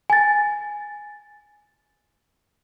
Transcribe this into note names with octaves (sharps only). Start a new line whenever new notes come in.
G#5 A6